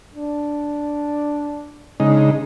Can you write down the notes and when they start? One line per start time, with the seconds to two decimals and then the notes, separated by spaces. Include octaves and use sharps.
0.15 D4
2.00 C#3 G#3 D4 D#4